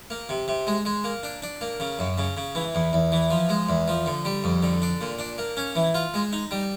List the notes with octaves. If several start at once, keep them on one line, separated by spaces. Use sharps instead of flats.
A#3
C3
C3
G#3
G#3
A#3
D4
D4
A#3
C#3
F#2
C#3
C#3
E3
E2
E2
E3
F3
G#3
E2
F3
D3
G3
F2
D3
D4
A#2
D4
A#3
C#4
E3
F4
G#3
D#4
G3